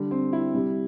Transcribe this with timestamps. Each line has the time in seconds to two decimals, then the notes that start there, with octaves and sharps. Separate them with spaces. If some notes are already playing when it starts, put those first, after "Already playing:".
Already playing: D3 G3
0.11 C4
0.33 E4
0.54 C3 G3